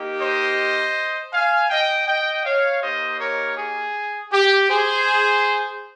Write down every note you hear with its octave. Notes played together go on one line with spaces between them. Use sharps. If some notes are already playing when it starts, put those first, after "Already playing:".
Already playing: A#3 D#4 G4
C5 D#5
F5 G#5
D#5 G5
D#5 G5
C#5 F5
A#3 D#4 G4 C5 D#5
A#4 C#5
G#4
G4
G#4 C5